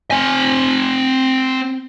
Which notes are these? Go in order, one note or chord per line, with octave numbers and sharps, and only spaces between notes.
C4 G#5